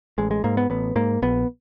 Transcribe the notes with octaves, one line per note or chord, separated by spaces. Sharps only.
A1 G#3
G#3
G#2 A#3
B3
A1 B3
G#2 A#3
A#1 B3